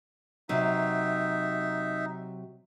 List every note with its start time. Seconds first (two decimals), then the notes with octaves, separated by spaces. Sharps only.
0.49 C3 F#3 D#4 E5